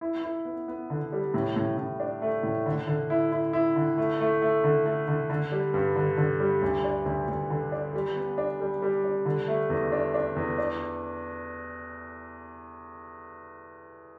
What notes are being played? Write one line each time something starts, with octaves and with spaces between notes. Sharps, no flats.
E4
E4
B3
B3
D3
G3
A2
A2
A2
D4
A3
A2
D3
D3
E4
E4
E4
D3
A3
A3
A3
D3
A3
D3
D3
G3
G2
D3
D3
G3
D2
D4
D2
D2
D3
D4
G3
B3
D4
G3
G3
D4
D3
A3
E2
D4
D4
E2
D4